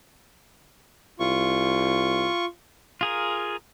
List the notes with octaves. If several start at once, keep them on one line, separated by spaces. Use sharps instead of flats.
C2 F4 C#6
F4 G#4 A#4